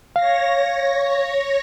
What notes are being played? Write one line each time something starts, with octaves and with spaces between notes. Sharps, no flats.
C#5 F5 A#6